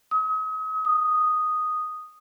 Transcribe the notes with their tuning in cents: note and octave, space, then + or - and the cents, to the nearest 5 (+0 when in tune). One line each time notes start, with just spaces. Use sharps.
D#6 +40
D#6 -5